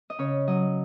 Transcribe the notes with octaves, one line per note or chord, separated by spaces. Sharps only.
D#5
C#3 C#5
F#3 D#5